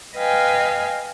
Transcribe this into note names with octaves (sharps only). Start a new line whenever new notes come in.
B4 D#5 F5 G5 G#5